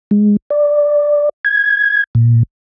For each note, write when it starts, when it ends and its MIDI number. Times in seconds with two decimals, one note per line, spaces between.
0.11 0.37 56
0.50 1.29 74
1.45 2.04 92
2.15 2.43 46